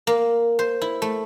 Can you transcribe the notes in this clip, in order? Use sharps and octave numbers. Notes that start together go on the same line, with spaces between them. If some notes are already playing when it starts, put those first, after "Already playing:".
A#3
C5
E4
A3